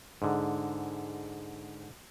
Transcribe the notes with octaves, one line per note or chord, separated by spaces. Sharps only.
G#2 D3